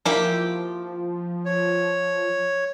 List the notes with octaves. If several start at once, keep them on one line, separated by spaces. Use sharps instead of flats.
F3 A#3 E4 G4
C#5